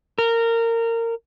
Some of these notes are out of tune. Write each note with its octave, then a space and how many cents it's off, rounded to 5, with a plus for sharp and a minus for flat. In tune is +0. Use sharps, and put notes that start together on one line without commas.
A#4 -20